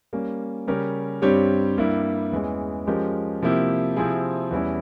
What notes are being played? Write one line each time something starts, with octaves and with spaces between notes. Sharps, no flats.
G3 A#3 C#4
C#3 G3 C#4 G4 A#4
G2 G3 C4 G4 C#5
G2 G3 A#3 E4
E2 E3 G#3 C#4
F3 G#3 C#4 G4 A#4
C3 F3 A#3 E4 G4
C3 F3 C4 E4 G#4
E2 E3 G3 C#4 E4